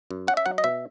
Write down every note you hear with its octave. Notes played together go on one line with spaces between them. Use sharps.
F#2
C#4 F#5
E5
F#3 F#5
D#5
B2 E5